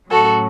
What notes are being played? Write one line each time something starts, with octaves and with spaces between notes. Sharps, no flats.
A2 F#3 C#4 F#4 A4